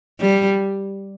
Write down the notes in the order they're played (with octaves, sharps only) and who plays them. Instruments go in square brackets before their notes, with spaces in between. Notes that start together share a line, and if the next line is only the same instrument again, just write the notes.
[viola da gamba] G3